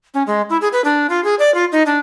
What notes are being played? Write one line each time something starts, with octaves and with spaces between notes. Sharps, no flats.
C#4
G#3
E4
G#4
B4
D4
F4
G#4
D5
F4
D#4
D4